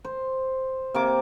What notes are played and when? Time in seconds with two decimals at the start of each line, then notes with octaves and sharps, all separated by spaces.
0.04 C5
0.94 C3 A#3 D6